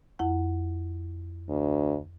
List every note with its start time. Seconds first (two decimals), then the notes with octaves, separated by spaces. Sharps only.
0.19 F2 E4 F#5
1.49 D2